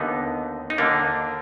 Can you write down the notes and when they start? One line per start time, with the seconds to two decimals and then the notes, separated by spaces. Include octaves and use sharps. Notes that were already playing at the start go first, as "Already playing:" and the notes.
Already playing: D#2 D3 B3 D#4
0.70 D#4
0.78 D#2 D3 A#3 D4